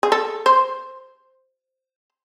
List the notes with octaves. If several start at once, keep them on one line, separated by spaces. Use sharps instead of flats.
G#4
A4
C5